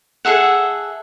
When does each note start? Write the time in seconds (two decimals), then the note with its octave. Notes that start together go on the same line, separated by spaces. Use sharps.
0.25 G#4 A4 E5 F#5